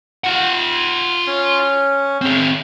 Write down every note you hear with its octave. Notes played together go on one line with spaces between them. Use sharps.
F4 F#5
C#4
C4 G#4